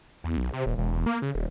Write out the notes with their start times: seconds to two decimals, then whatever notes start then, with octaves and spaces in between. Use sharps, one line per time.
0.24 E2
0.37 B1
0.53 C3
0.66 D#1
0.78 E1
0.92 E1
1.06 A#3
1.22 C#3
1.35 D#1